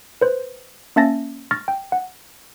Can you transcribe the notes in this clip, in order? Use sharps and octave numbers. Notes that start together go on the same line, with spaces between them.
B4 C5
A#3 C#4 E5 A5 A6 A#6
C#6 F6 A6 A#6
G5
F#5